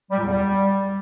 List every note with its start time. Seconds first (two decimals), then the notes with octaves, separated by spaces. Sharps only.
0.11 G3
0.18 A#2
0.24 E2
0.31 G3